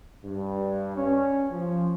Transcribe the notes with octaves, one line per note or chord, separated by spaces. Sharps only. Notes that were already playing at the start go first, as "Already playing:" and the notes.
G2
C#4
F3